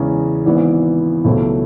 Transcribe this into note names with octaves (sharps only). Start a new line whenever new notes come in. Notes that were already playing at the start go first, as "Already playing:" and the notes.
Already playing: E2 C#3 G#3 C#4
G#1 G#2 E3 B3
C#2 B2 F#3 A3 E4